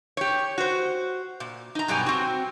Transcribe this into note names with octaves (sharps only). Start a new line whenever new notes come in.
G4 C#5
F#4 C5
A#2
D#4 A#5
G2 B2 F#3 G4 G#5
C4 F#4